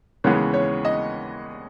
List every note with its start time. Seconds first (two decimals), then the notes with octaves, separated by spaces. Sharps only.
0.24 D#2 C#3 E3 G#3 B3 C#5
0.54 C#5
0.85 D#5